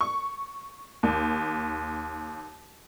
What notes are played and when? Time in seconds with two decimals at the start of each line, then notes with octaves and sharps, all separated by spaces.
0.01 C#6
1.03 D#2